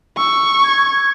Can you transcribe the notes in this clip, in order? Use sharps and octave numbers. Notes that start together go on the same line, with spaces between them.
C#6 E6
G#6